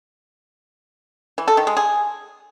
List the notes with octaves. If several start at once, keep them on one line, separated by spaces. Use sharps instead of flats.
E3
A4
D#3
G#3
G#4